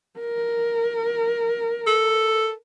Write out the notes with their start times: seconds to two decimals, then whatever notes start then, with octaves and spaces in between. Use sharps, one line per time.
0.20 A#4
1.87 A4